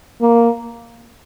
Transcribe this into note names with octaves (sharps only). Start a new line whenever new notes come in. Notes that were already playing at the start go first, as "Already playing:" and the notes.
A#3